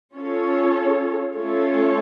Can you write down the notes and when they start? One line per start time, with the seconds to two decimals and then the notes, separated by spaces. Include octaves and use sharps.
0.15 C#4 F4 A4 C#5
1.34 A3 C#4 F4 A4 C#5